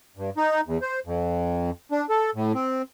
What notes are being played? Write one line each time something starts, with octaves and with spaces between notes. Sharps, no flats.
G2
D#4
E2
C5
F2
D4
A4
A2
C4